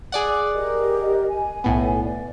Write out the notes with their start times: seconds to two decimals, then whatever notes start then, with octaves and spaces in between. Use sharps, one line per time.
0.12 G#4 D5 F#5
0.55 G4 A#4 D#5
1.28 G#5
1.64 B1 A2 B3
2.04 D5